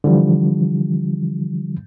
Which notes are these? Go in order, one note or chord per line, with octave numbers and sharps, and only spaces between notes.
D3 E3 F3 G3